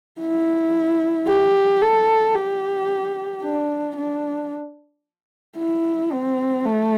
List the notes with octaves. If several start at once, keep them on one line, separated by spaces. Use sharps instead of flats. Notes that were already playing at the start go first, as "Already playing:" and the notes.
E4
G4
A4
G4
D4
D4
E4
C4
A3